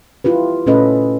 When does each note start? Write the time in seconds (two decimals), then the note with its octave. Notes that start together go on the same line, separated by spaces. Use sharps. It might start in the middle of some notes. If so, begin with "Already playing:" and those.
0.24 E4 F4 G4 B4
0.66 A#2 A3 C#4 A4 B4 D#5